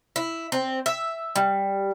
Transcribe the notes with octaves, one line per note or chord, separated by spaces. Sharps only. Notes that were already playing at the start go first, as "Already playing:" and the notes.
E4
C4
E5
G3